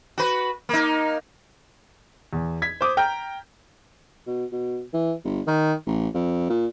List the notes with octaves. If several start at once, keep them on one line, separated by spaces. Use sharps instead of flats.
F#4 B4
A#3 D#4
E2
G#6 B6
C5 D6 D#6
G5 A#5 F6 G6
B2
B2
E3
G1
D#3
A1
F2
A#2